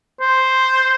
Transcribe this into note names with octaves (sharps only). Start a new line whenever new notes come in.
C5